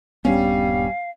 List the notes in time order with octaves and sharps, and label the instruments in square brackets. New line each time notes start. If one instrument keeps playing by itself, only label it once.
[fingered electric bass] D#1 G2 B3 [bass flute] G3 [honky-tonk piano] C#4 [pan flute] F5